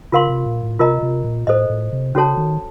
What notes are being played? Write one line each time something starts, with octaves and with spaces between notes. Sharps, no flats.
C#3 F4 A#4 F5 C6
C3
A#2
A2
C3 F4 A#4 D#5 A#5
C3
A#2
A2 A4 C5 D#5
A2
C3
C#3 C#4 F#4 A4 C#5 A5
D#3